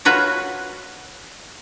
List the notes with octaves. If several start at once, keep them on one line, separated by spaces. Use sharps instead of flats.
F4 F#4 B4 C#5 A#5